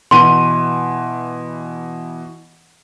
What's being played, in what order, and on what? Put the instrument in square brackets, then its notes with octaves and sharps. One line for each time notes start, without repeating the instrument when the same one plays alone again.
[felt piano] B2 E3 D#7 [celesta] C6